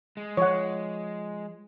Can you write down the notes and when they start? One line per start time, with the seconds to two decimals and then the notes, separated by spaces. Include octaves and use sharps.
0.17 G#3
0.37 F3 C#5 F#5